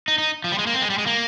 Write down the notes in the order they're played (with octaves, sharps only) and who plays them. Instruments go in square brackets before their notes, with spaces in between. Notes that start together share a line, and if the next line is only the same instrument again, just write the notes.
[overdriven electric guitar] D#4
D#4
F3
G3
G#3
A#3
C4
G#3
G3
G#3
A#3